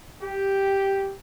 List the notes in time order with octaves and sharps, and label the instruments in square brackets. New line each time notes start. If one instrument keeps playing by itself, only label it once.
[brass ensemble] G4